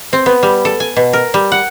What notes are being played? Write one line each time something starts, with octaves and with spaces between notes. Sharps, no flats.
C4
B3
G3
A4
G#5
B2
A#4
G3
F#5